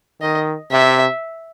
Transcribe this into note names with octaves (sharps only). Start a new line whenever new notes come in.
D#3 D#5
C3 E5